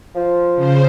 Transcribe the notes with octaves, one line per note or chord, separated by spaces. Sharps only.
F3
C#3 C5